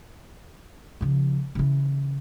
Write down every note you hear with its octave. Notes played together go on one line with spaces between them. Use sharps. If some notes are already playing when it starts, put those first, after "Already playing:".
C#3 F3
C#3 E3